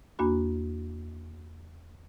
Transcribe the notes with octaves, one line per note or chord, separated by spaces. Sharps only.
E2 A#3 D4 F#4 B5